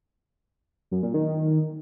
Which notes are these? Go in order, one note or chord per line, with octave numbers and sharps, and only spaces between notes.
F#2
A#2
D#3